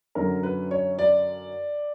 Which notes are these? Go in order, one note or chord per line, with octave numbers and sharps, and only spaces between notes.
F#2 D3 F#3 A#4
B4
C#5
D5